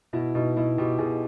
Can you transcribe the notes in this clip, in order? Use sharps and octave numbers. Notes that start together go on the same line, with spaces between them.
B2 E4
B2 D#4
B2 E4
B2 G4
B2 G#4